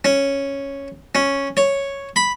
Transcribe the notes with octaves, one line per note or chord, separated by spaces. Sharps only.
C#4
C#4
C#5
B5